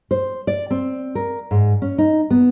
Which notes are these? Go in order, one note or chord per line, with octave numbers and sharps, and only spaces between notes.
C5
D5
C4
A#4
G#2
C#4
D#4
B3